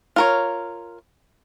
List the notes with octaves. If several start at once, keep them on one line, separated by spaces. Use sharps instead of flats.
F4 A#4 C#5